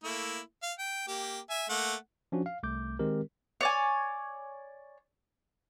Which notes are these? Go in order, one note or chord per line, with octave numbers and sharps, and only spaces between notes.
A3 A#3 E4
F5
G5
A#3 G4
E5 G#5
A3 A#3 F#5
F3 C#4 D4 F#4
F5
C2 A3 D6 G6
D#3 G#3 C4 G4 A#4
C#5 D5 G#5